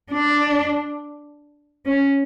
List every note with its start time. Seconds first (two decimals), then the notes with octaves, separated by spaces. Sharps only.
0.11 D4
1.85 C#4